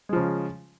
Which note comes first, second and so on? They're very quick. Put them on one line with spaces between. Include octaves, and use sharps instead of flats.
G#3 F3 C#3